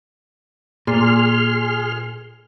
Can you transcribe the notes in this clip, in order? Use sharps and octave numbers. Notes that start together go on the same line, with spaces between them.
A#2 G#4 C6 F6